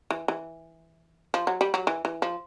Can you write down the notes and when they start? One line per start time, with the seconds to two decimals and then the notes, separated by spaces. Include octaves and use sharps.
0.10 E3
0.28 E3
1.34 F3
1.47 F#3
1.61 G3
1.74 F#3
1.87 E3
2.05 E3
2.22 F3